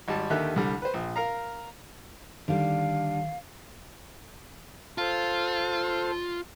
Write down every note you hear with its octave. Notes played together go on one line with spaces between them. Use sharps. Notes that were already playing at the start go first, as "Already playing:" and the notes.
G#1 G3 A5
D#2 D3 D#3 G4 E5 F#6
C2 D3 G3
B4 C5
A#1
A#4 F5 A#5
D3 D#3 G3 F5
F4 A4 C5